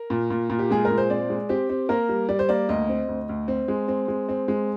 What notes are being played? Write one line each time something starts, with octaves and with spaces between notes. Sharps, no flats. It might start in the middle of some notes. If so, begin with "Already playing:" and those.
Already playing: A#4
A#2
A#2
A#2
G4
G#3 G#4
A#4
A#2
C5
C4 D5
G#3
C4 G4
C4
A#3 A#4
G3
G3 D5
C5
A#3 D5
D2 D#5
C4
D2
D2
C4
G#3
C4
G#3
C4
G#3